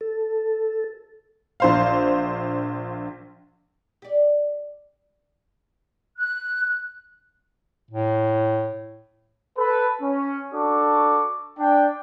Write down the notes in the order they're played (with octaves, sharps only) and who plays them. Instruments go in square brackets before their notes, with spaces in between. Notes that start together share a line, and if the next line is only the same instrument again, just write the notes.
[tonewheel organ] A4
[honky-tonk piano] A#1 C5 F5
[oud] G4 D5
[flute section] F#6
[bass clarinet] A2
[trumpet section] A4 B4
C#4
D4 F#4 A4 C#6 D6
D4 G5